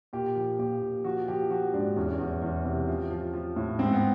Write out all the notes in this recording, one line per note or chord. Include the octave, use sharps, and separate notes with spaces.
A#2 G4
F3
A#2 G4
A#2
F3 F#4
F3 G4
F3 F#4
G#2 D4
E2 C#4
E2
E2
C3
F3
F3
F3
A2
G#2 C4
B3